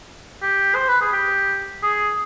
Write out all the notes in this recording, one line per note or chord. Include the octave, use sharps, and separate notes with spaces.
G4
C5
B4
G#4
G4
G#4